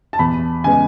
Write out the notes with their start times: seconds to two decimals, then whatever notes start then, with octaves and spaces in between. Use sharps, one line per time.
0.13 A5
0.19 E2 B5
0.64 C#3 G#3 B3 G#5